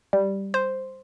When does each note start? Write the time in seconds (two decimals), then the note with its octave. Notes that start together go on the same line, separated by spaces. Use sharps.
0.13 G3
0.54 C5